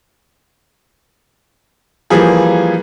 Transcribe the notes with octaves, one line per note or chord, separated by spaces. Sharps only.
E3 F3 G3 A#3 G#4